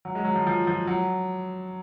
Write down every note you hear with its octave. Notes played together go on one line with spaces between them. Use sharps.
F#3
G#3
F#3
F3
F3
F3
F#3